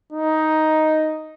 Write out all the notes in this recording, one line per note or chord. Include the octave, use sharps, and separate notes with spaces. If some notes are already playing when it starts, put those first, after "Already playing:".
D#4